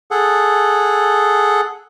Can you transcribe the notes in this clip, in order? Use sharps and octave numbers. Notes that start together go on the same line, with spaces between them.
G#4 A4 F#5